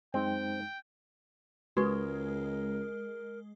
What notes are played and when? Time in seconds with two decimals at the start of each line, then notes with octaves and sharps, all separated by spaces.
0.14 F#2 G#3 C4 D#4 G5
1.77 C#2 G#3 F#4 A#4 B4 C#6